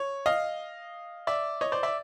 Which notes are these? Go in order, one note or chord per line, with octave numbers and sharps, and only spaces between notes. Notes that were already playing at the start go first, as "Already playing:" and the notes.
Already playing: C#5
D#5 F5
D5 E5
C#5 D#5
C5 D5
D5 E5